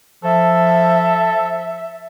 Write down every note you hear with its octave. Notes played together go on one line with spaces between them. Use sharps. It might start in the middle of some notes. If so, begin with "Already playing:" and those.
F3 A4 E5